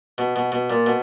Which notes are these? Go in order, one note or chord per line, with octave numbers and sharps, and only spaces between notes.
B2
B2
B2
A#2
B2